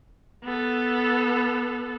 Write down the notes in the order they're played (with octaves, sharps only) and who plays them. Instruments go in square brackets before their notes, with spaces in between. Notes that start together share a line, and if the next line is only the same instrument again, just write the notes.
[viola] B3 A4